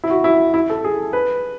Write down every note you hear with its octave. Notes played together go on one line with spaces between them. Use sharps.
E4
F#4
E4
E4
A4
G#4
B4